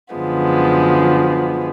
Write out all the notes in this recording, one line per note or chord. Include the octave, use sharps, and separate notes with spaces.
F#2 D3 F3 G#3 B3